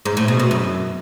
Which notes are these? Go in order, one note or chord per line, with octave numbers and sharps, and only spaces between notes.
G#2
A2
B2
B2
F#2